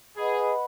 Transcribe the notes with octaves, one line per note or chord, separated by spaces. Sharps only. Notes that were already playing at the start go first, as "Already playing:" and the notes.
G#4 B4 D#5 F#5 B5